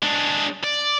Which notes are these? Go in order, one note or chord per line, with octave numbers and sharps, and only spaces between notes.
G#3 D4
D5